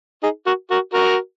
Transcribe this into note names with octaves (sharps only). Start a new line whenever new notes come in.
D#4 G#4
F#4 A#4
F#4 A#4
F#4 A#4